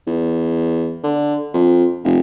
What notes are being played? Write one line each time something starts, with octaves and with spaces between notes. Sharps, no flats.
E2
D3
F2
F1